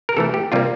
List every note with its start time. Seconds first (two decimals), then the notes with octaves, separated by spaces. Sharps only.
0.09 A#4
0.17 C3 E3 A3 A4
0.34 G4
0.52 C3 G3 A#3 F4